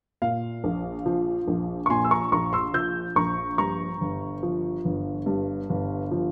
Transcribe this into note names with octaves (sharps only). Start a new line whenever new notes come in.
A#2 F5
A#1
F3
A#1
C#6
A#2 G#5 C6
E6
A#5 C#6
A#1 A#5 C#6
C6 E6
F3 E6 G6
A#1 A#5 C#6
G2 A#5 C#6
G1
F3
G1
G2
G1
F3